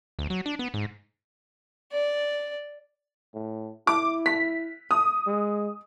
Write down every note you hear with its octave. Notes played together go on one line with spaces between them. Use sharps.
D2
F#3
D4
B3
G#2
D5
A2
E4 D6
B6
D#6
G#3